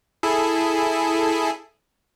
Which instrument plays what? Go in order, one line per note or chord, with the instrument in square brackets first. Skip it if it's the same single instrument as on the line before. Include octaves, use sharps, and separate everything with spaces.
[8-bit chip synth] E4 G#4 A4